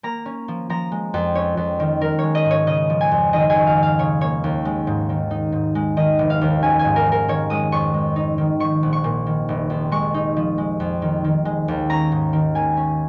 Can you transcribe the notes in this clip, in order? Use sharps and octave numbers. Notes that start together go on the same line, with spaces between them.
A#3 A#5
C#4
F3
F3 A#5
G#3
F2
C#4 C#5
F2
D#3
D#3 A#4
G#3 C#5
D#5
G#2
C#5
C#3 D#5
F3
G#5
F2
D#3 D#5
G#5
C#4
F5
G#2
F5
C#3 C#5
A#3 C#5
D#2
G#3
G#2
D#3
D#4
G#2
G#3
D#3 D#5
F1
F5
D#2
C#4 G#5
G#5
G#2
A#4
F3
A#4
D#3 C#5
G#3 D#6
F2 C#6
G#3
D#4
D#3
F3 C#6
A#1
C#6
A#2
D#3
F1
F2
G#3 C#6
D#4
F3
G#3
F2
D#3
D#3
G#3
D#2
C#4 A#5
G#2
D#3
A#3 G#5
C#4